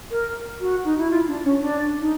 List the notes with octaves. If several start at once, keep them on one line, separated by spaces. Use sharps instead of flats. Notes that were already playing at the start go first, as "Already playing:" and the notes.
A#4
F#4
D#4
E4
F4
D4
C#4
D4
D#4